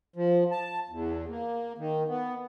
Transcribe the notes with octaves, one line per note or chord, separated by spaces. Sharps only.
F3
A5
E2
A#3
D#3
B3